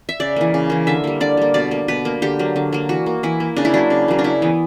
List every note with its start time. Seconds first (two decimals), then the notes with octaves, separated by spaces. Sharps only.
0.09 E5
0.20 C#3 D5
0.36 E3 A#3
0.54 C#3
0.70 E3 A#3
0.87 D3 E5
1.04 G3 A#3
1.21 D3 D5
1.37 G3 A#3
1.54 B2 D5
1.71 A#3
1.88 B2 B4
2.05 A#3
2.22 D3 G4
2.39 F#3 A#3
2.56 D3
2.73 F#3 A#3
2.89 E3 F#4
3.06 A#3
3.23 E3 E4
3.40 A#3
3.56 C#3 D4
3.65 E4
3.74 F#3 A#3 D4
3.90 C#3
4.08 F#3 A#3
4.19 D4
4.24 C#3 E4
4.42 E3 B3